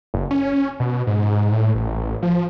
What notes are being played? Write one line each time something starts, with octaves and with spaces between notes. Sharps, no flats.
F#1
C#4
B2
G#2
A2
A1
F3